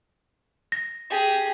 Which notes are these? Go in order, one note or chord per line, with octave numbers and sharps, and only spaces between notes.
A#6
G4 G#4